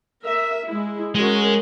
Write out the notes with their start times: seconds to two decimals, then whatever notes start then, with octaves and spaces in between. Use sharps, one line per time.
0.22 A#4 E5
0.66 G#3 E4
1.15 G#3 C#4 F#4 A#4